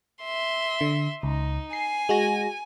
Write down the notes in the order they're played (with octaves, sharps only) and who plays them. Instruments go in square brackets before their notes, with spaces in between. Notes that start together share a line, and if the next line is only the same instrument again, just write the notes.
[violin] E5 C6
[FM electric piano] D3
[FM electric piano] C#2 [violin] D#4
[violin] G#5 [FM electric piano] C7
[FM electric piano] G#3 F#4 A#6